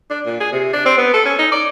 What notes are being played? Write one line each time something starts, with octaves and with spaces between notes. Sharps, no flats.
D4
A#2
G#4
C3
D4
C4
B3
A4
C#4
D#4
D5